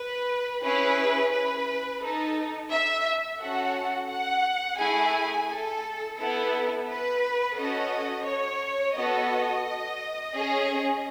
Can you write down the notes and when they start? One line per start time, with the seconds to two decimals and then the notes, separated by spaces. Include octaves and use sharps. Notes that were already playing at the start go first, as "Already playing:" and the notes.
Already playing: B4
0.63 C#4 E4 G#4 B4
1.32 B4
2.01 D#4 A4
2.71 E5
3.40 C#4 F#4 A4 F#5
4.09 F#5
4.79 A3 E4 G#4 G#5
5.48 A4
6.17 B3 E4 A4
6.88 B4
7.56 C#4 F#4 A4 D#5
8.25 C#5
8.96 B3 F#4 A4 D#5
10.34 C#4 G#4